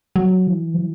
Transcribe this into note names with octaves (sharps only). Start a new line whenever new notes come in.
F#3
E3
F#3
E3